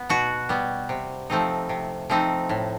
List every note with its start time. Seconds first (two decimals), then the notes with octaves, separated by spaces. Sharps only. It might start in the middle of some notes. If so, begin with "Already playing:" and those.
Already playing: B3
0.10 B2 F#4
0.49 G3 B3
0.89 C3
1.30 F3 A3 C4 D#4
1.69 C3
2.10 F3 A3 C4 D#4
2.49 A2